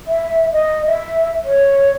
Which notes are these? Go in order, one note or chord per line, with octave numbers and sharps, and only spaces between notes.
E5
D#5
E5
C#5